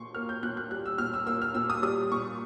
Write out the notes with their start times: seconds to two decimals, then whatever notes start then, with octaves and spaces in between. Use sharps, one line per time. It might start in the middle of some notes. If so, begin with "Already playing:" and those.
Already playing: A#2 C6 C#6
0.15 A#3 F6
0.29 G6
0.43 A#2 F#6
0.57 F#6
0.71 G3 F#6
0.86 E6
0.98 A#2 F6
1.14 E6
1.27 A#3 E6
1.42 F6
1.54 A#2 E6
1.70 D#6
1.83 G3 D#6
2.12 A#2 C#6